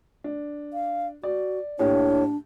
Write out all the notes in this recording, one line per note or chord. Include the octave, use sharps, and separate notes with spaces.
D4
F5
F#4 D5
A2 A#3 D4 G4 C#5